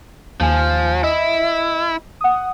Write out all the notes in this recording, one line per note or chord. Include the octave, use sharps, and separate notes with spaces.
D#2 F3 G#5
E4 D#5
F#5 D#6